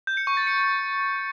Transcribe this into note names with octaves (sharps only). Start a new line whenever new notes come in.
G6
C#7
C#6
A6
C#7